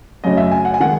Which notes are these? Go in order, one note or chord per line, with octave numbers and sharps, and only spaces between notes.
F#2 C#3 F#3 A3 D#5
E5
G#5
F#5
G#5
D#3 G#3 F#5